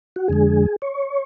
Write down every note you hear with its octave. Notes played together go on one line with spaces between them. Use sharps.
F#4
F2 D3 G#3 G#4
C#5